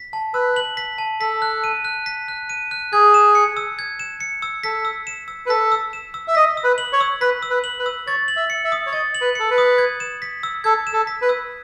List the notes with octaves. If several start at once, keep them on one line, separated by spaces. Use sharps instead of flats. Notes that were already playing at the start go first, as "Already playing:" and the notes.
Already playing: B6
A5
B4 E6
F#7
B6
A5
A4 B6
F#6
D#7
F#6
B6
F#6
D#7
F#6
G#4 G#6
E7
C#7
E6
G#6
E7
C#7
E6
A4 B6
E6
E7
E6
B4
A4 B6
E6
E7
E6
E5
D#5 B6
E6
B4
F#7
C#5
E6
B4 B6
E6
B4
F#7
B4
E6
C#5 A6
F#7
E5
C#7
E5
D#6
C#5
D#5 A6
F#7
B4
A4 C#7
B4
D#6
G#6
E7
B6
E6
A4 G#6
E7
A4
B6
B4
E6